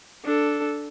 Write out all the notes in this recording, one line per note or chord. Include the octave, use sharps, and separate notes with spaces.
D4 A4